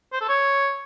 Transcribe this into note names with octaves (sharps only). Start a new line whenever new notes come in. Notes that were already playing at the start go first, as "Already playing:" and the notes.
C5
A4
C#5